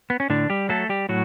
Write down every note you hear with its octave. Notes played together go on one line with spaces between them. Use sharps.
B3
C#4
A2 D3 D4
G3 G4
F#3 A3 A4
G3 G4
A2 F#3 F#4